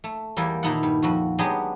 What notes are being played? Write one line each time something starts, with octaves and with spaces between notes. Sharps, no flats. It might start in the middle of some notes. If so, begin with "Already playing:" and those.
A3
E2 G3 A#3 A4 G5 G#5
A#2 D#3 D#4 E4 A4 F#5
G2
F2 F#4
F#3 G#3 B3 D4 G4 G#4